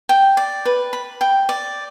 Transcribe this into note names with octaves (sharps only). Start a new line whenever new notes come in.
G5
D5
B4
B5
G5
D5